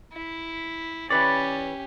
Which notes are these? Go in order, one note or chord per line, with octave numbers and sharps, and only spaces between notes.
E4
E3 C#4 G4 B4 C#5 D5